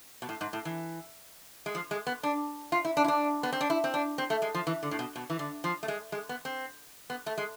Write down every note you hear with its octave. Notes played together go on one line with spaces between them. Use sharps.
B2
A2
G#2
A2
E3
G#3
F3
G#3
B3
D4
F4
E4
D4
E4
D4
B3
C4
D4
E4
C4
D4
C4
A3
G#3
F3
E3
D3
A2
B2
B2
E3
D3
F3
A3
G#3
G#3
B3
C4
B3
A3
G#3